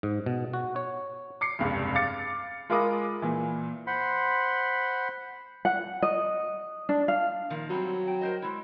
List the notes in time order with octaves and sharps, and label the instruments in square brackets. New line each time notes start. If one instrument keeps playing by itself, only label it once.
[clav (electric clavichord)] G#2
B2
F#4
C#5
[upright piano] D6 C7 C#7
F1 C#2 G2
F5 D6 A6 C#7
G#3 F4 A#4 B5 D6 D#6
A#2 E3
[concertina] C5 F#5 B5 C6
[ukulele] F#5
D#5
D4
F5
[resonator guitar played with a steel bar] A#2 D#3 F3
[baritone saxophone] F#3 [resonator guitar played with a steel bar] G3 C4
[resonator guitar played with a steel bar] G5
A#4 C5 D#5
G#3 E4